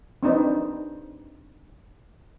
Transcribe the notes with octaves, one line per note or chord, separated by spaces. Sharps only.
C4 D4 D#4 B4 C5